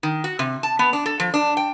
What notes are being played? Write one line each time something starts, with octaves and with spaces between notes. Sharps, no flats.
D#3
F#4
C3
A5
B3
D4
A4
F3
D4
G5